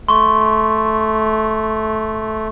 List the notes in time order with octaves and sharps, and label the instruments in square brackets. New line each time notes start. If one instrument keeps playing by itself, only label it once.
[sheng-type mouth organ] A3 [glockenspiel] C6 C#6